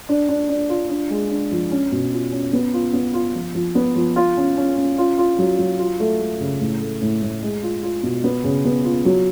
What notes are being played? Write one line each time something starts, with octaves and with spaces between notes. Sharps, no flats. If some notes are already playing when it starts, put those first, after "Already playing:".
D4
D4
D4
F4
D4
G#3
D4
F3
C#4
B2
F4
C#4
B3
F4
B3
F4
F3
F3
B3
F3
F4
C#4
C#4
C#4
F4
F4
F#3
F#3
F4
A3
A3
C#3
A2
A3
A2
A2
G#3
F4
F4
B2
B3
C#3
B3
F4
F#3